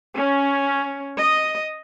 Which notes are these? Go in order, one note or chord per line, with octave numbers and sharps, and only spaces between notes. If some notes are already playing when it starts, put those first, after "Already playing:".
C#4
D#5